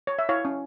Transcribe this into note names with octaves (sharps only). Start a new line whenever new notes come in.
C#5
E5
E4 C#5 F5
C#4